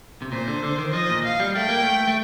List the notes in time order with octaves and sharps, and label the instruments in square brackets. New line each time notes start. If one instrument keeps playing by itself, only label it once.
[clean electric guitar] C3
[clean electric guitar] A#2 [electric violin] C5
[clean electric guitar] D3
D3
D#3
[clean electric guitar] F3 [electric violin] D#5
[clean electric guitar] A#2
[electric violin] F5
[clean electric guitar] G3
[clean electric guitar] A3 [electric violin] G5
[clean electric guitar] A#3
A3
A3